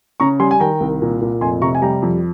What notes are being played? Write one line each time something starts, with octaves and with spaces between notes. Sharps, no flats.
C#3 A#5 C#6
G3 G#5 C6
G#5
D#3 G5 A#5
C2
A#2
A#2
F1 G#5 C6
C3 A#5 C#6
G#5
G3 G5 A#5
F2